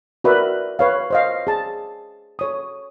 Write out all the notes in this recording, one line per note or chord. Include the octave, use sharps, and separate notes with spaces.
F#4 A#4 B4 D5 E5
B4 C#5 F5
C5 D#5 F5
G#4 A5
A4 C#5 D#6